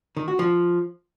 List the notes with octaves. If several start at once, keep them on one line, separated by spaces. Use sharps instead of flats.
D#3
F#4
F3